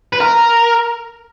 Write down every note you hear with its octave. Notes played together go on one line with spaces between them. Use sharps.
B4
A#4